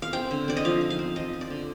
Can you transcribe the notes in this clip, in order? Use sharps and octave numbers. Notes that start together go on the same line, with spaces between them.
F5
C4 G5
D3
C4 D5
D#5
F3 F5
D#4
F5
C4
F3 D#5
C4
D5
D3